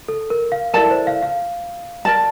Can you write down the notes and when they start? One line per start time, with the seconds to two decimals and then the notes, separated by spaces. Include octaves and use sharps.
0.08 A4
0.30 A#4
0.52 F5
0.74 E4 A4 A#4 D5 A5
0.91 C5
1.07 F5
1.23 F5
2.05 A#4 D5 A5